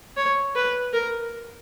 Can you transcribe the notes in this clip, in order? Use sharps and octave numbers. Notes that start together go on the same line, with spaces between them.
C#5
B4
A#4